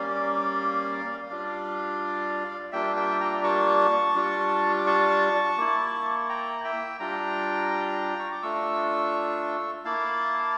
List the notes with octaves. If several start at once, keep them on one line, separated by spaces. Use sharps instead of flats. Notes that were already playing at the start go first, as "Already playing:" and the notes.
Already playing: G3 A#3 C#4 D5 F5
G3 D4 F4 D5 F5
G3 A#3 D4 F4 E5 G5
E5 G5
G5 A#5
A5 C#6
G3 D4 F4
D6
A5 C#6
A#3 E4
G5 A#5
E5 G5
G3 D4 F4 G5 A#5
C#6
D6
A3 D4 F4 C#6 E6
A#3 E4 F5 A5